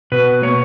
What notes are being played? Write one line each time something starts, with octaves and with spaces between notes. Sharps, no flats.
B2 B4
A#3 C#5